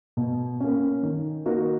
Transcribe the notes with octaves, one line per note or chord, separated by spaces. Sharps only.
B2
A#3 C#4
D#3
A#3 D#4 F#4 A#4